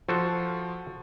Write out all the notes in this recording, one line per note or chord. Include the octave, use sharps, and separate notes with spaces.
F3 F4 F#4 A4 C5